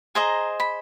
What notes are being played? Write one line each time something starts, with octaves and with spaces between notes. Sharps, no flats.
G#4 C5 D#5 A#5
B5